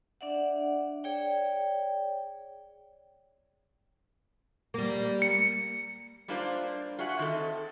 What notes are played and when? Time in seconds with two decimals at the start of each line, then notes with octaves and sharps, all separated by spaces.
0.21 D4 D5 E5 F#5
1.04 G#4 C#5 D5 G5
4.74 G3 A#3
5.22 C#7
6.28 G3 A#3 D4 F4 A#4 C5
6.99 F4 F#4 G#4 E5 F#5
7.19 D#3 C4 A4 D#5